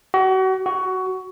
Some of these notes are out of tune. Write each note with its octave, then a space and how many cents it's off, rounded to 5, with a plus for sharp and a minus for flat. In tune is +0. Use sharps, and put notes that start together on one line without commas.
F#4 +35
F#4 +15